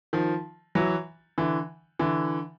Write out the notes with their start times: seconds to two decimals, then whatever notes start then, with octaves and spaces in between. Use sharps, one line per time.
0.13 D#3 F3
0.75 E3 F#3
1.38 D3 E3
1.99 D3 E3